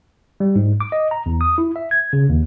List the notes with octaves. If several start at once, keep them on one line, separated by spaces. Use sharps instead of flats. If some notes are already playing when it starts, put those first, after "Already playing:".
G3
G#2
D6
D#5
A#5
E2
D#6
E4
E5
G#6
C#3
D#2